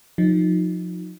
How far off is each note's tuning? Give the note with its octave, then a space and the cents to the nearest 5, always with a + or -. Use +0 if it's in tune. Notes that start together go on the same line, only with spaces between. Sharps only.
F3 +35 D#4 +0